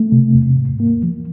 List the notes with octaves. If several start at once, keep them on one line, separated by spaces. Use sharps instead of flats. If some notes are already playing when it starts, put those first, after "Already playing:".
Already playing: A3
C3
E2
G#2
A#3
F3